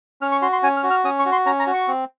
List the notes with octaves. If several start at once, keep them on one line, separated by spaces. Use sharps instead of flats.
C#4 F6
C#6
F#4 C6
C6
C#4 G#5
F6
F#4
F6
C#4 D#6
C#6
F#4
C6
C#4 A#5
A#5
F#4
C#6
C4